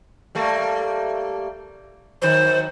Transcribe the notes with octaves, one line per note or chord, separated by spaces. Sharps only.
G3 A3 A#3
D#3 F#3 C5